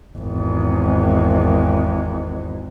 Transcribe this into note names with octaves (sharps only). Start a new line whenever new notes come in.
G#1 E2